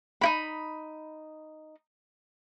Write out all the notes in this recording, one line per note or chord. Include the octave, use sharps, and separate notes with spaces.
D#4 E4 B5